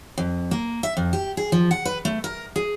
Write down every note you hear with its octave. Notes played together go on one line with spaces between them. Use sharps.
F2
A#3
E5
F2
G4
G#4
F3
F#5
B4
A3
A#4
G#4